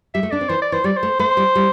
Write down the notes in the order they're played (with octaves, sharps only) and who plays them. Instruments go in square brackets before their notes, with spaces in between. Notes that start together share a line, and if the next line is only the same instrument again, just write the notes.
[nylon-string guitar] G3 [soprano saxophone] E5
[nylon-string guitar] A3
[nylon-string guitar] D4 [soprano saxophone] D5
[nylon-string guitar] C4
[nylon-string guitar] E3 [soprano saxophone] C5
[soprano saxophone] D5
[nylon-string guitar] E3 [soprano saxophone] C5
[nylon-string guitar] G3 [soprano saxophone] D5
[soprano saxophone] C5
[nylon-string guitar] A3
[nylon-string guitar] A3 [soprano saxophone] C5
[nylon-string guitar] G3
G3